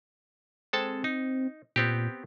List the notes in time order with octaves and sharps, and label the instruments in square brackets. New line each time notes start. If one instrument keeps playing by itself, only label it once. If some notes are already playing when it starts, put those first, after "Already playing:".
[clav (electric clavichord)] G#3 A4 A5 [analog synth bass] C4
[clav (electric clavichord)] D#4
[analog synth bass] A#2 [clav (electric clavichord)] B3 C4 G4